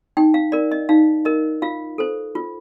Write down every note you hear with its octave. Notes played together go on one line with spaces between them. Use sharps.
D#4 G5
F5
A#4 D5
D#5
D#4 F5
A#4 D#5
F4 F5
A4 C5
F4